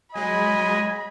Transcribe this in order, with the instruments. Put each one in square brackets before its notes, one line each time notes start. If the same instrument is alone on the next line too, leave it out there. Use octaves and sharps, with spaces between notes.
[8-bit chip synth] F#3 G#3 [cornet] D#5 [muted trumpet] G#5 [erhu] B5